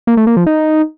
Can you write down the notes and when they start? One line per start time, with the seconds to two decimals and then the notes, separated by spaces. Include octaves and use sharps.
0.07 A#3
0.17 A3
0.27 A#3
0.37 F3
0.46 D#4